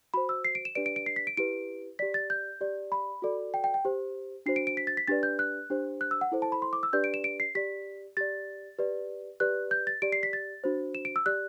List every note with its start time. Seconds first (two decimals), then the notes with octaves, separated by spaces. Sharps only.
0.14 F#4 C5 B5
0.29 E6
0.45 C7
0.55 D7
0.65 E7
0.75 D4 G4 B4 D5 D7
0.86 D7
0.96 D7
1.06 C7
1.16 B6
1.27 D7
1.37 E4 G4 B4 D7
1.99 G4 D5 B6
2.14 A6
2.30 G6
2.61 G4 D5
2.92 B5
3.22 F#4 A4 D5
3.54 G5
3.64 G5
3.74 G5
3.85 G4 C5
4.46 D4 F#4 C5 C7
4.56 D7
4.67 D7
4.77 B6
4.87 A6
4.97 B6
5.08 D4 G4 B4 D5 A6
5.23 G6
5.39 F#6
5.70 D4 G4 C5
6.01 F#6
6.11 E6
6.21 F#5
6.32 E4 A4 C5
6.42 A5
6.52 B5
6.62 C6
6.73 D6
6.83 E6
6.93 D4 G4 B4 D5 G6
7.04 D7
7.14 E7
7.24 D7
7.40 C7
7.55 G4 D5 B6
8.17 G4 D5 A6
8.79 G4 B4 D5
9.40 G4 B4 D5 F#6
9.71 G6
9.87 A6
10.02 G4 D5 D7
10.12 C7
10.23 B6
10.33 A6
10.64 D4 F#4 C5
10.95 E7
11.05 D7
11.16 E6
11.26 G4 D5 F#6